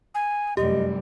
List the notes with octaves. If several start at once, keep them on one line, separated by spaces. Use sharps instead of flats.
G#5
F1 F#2 G3 G4 D#5